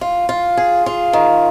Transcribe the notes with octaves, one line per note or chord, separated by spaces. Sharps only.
F4
F4
G#4
F4
D#3